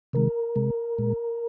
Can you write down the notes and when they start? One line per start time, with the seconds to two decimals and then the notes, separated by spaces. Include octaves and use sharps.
0.13 C3 D#3 G#3 A#4
0.56 C3 G#3
0.98 A#2 G#3